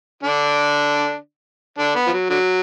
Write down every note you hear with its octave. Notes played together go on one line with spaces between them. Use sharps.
D3 D4
D3 D4
B3
F3
F#3
D3 F#3